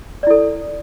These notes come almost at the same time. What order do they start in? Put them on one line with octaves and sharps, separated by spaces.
D5 E4 A4